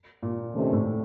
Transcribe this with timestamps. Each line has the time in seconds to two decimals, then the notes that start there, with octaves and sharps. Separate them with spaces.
0.23 A#2
0.53 F2 C3 D#3 A3 C#4
0.73 A2